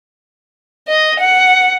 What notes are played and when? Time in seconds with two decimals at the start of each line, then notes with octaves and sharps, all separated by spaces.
0.88 D#5
1.20 F#5